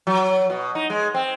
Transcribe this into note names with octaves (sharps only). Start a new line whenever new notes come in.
F#3
B2
D#4
G#3
C4